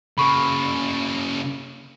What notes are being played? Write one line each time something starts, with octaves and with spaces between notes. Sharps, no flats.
C#3 A#3 B5 C#6